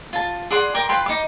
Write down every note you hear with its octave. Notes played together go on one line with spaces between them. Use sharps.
F4 A5
G#4 D5 F#5 C6
A#4 G5 C6 D6
F4 B4 G5 C6
D#4 D6